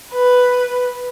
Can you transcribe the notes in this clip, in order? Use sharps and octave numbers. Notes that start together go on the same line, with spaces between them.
B4